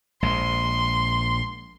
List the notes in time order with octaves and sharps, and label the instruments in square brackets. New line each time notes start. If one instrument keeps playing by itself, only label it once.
[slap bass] A#1 G#3 [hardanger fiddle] C6